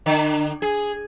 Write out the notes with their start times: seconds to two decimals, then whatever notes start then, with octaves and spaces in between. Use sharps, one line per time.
0.06 D3
0.62 G#4